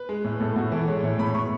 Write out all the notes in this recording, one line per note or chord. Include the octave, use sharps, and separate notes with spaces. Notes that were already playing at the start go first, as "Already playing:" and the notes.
Already playing: B4
G#3
A2
A2 A4
A2 F#4
E3 A4
G#3 C#5
A2 C#5
A2 B5
A2 C#6